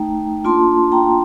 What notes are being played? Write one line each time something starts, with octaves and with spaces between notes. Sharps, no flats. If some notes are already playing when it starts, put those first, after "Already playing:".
Already playing: A3 D#4 G5 A#5
A#3 D4 F4 A5 C6
G5 A#5